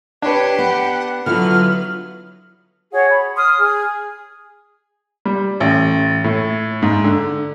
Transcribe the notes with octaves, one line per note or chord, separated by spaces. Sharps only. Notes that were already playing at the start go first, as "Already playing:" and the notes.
D4 G4 B4 C#5
B3 F#5
D3 F#3 B3 E4 F4 F6
F#4 G#4 C#5 F#5
B5
C6 D#6 F6
G#4
G3
A1
A2
G#2
D3